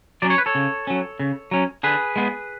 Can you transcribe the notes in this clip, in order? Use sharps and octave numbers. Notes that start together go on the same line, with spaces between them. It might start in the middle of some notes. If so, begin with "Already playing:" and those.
F#3 C#4 D5
C#5
B4
A4 C#5
C#3
F#3 C#4
C#3
F#3 C#4
D3 G#4 B4
G#3 B3